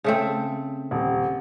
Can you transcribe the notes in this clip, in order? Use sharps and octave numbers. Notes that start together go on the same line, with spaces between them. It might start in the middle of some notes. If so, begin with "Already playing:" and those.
C#3 A3 C4
D#1